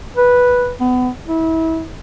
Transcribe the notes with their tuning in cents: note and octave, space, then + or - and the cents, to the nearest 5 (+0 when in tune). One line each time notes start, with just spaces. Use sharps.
B4 -5
B3 +25
E4 -30